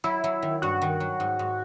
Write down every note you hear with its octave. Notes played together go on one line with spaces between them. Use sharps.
F#3 E4
F#3
D#3
G2 F#4
D#3
F#3
G#2
G#2